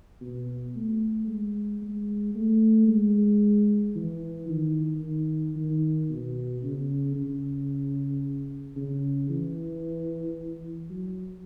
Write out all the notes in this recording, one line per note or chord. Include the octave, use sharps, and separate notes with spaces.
B2
A3
G#3
G#3
A3
G#3
E3
D#3
D#3
D#3
B2
C#3
C#3
C#3
E3
F#3